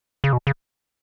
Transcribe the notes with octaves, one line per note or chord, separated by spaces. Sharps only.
C#3
B2
C#3